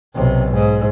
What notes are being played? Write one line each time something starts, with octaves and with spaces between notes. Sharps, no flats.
B1 C3
G#2